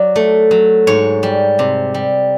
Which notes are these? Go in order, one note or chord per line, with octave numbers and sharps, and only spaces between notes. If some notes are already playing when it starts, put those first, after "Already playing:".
Already playing: F#3 D5
A3
F#3
G#2 C#5
G3
C3
G3